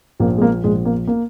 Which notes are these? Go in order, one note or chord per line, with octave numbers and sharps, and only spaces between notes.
A#1 A#3
G#3
A#3
A#1 G#3
A#3
A#3